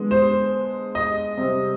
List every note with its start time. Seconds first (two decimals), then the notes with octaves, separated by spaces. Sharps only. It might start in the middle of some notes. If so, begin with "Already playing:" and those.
Already playing: D3 G#3 B3
0.11 C5
0.95 D#5
1.37 C3 G3 C4